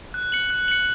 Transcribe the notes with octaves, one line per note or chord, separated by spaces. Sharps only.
F#6
C#7 F#7
F#6
C#7 F#7